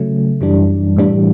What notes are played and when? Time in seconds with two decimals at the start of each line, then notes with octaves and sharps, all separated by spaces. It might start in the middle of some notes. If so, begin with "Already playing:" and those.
Already playing: C#3 F#3 A3
0.41 F#2 E3 G3 D4
0.97 A2 E3 G3 D4